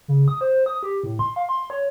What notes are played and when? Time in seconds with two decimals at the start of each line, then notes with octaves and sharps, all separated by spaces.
0.08 C#3
0.28 D#6
0.41 C5
0.66 D#6
0.83 G4
1.04 A2
1.19 C6
1.36 F5
1.49 C6
1.70 C#5